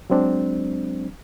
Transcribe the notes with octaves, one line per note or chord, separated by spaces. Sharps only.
F#3 G#3 C4 D4